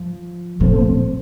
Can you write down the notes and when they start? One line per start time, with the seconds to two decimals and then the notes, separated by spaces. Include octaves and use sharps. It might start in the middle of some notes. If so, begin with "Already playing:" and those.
Already playing: F3
0.60 A#2 F3 A3 C4